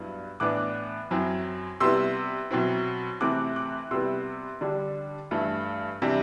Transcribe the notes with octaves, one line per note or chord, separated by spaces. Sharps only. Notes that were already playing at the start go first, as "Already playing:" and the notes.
Already playing: G2 F#3 B3 E4
A2 E3 B3 D4 D6 F#6
F#2 F#3 C4 E4
C3 G3 B3 E4 C6 E6
B2 F#3 C4 E4
C3 E3 A3 C4 E4 D6 F#6
D6 F#6
C3 G3 B3 E4 C6 E6
D3 G3 D4
G2 E3 A3 E4
C3 E3 G3 D4